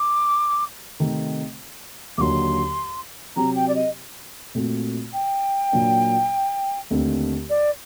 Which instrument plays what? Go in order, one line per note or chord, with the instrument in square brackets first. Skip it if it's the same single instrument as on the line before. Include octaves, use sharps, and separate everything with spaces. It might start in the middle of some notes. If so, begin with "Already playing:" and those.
Already playing: [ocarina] D6
[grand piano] C3 D#3 A3 C4 D#4
[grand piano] D#2 D3 F#3 A#3 [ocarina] C6 D6
[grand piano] C3 F#3 C4 G4 [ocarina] A#5
[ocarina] G5
D5
D#5
[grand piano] A#2 A3 C4 F#4
[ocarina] G5
[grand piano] A#2 F#3 A#3 D4
D#2 D3 A3 C4
[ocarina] D5